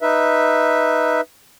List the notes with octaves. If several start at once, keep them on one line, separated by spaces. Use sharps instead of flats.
D#4 B4 E5